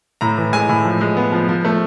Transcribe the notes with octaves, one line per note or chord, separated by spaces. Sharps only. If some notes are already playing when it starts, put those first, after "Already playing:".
A2 A#5
E3
G#3 G#5
A2
F3
G#3
B3
F3
F3
A3